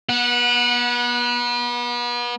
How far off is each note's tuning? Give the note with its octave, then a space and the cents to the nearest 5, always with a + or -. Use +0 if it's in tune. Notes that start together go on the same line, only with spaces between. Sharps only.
B3 -35 F#5 -15